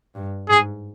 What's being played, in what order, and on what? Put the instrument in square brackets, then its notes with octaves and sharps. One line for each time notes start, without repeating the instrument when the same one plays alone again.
[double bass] G2
[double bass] G#2 [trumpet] G#4